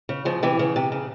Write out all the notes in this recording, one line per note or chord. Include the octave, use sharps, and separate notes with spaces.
C#3
C#3 F3
C3 E3
C#3
C3
C#3